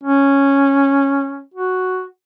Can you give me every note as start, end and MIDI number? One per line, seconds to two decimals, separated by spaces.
0.04 1.43 61
1.54 2.05 66